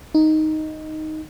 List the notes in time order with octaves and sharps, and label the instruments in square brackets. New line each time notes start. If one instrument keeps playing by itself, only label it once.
[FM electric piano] D#4